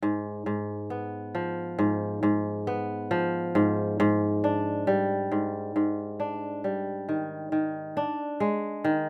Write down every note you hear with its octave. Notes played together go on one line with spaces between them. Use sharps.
G#2
G#2
B3
F3
G#2
G#2
B3
F3
G#2
G#2
D4
G3
G#2
G#2
D4
G3
D#3
D#3
D4
G#3
D#3